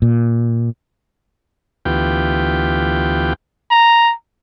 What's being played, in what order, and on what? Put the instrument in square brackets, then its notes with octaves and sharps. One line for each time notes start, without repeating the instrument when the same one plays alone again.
[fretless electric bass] A#2
[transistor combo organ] D2 E3 B3 F4 G4 G5
[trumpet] A#5